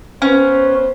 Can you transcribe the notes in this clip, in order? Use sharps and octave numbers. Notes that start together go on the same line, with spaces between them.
B3 C#4 B4 C5